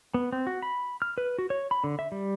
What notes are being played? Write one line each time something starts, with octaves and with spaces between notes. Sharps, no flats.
B3
C4
F#4
B5
F6
B4
F#4
C#5
B5
D3
E5
G3